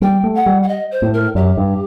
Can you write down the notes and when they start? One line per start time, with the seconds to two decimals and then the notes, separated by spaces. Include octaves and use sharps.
0.01 G3 G5
0.24 A3
0.35 F#5
0.46 G3
0.63 F#5
0.68 D#5
0.92 C5
1.02 A2
1.14 A#4
1.35 F#2 G4
1.57 G2